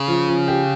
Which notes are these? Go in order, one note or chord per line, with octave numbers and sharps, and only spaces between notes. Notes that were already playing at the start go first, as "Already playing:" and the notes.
Already playing: C#3
F3
F3
G4